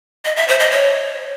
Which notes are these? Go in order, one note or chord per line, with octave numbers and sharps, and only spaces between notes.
D#5
E5
C5
D#5
C#5